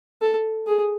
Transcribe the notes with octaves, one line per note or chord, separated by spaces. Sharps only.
A4
G#4